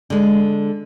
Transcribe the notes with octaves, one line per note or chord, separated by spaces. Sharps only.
D3 G#3